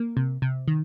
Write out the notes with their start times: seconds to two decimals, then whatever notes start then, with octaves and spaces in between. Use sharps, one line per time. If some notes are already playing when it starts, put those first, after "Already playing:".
Already playing: A#3
0.17 C3
0.42 C3
0.68 D#3